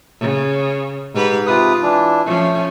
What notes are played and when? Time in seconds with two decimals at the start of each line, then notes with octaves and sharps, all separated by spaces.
0.20 C#3
1.14 G#2 G4 B4
1.47 C3 F4 B4 D#6
1.82 E3 D4
2.26 F3 A3 C#4